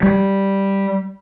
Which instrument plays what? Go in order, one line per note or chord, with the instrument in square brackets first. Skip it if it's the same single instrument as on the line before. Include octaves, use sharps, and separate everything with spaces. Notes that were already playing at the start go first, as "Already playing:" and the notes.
[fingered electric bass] G3